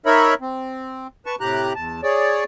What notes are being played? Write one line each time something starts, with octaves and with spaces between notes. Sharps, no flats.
D#4 A#4 C#5 E5 B5
C4
B4 A5 C#6
A2 C3 G4 A#5 F#6
E2 A5
G#4 C#5 D5